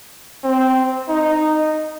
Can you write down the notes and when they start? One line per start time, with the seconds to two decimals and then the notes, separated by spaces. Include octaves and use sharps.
0.44 C4
1.09 D#4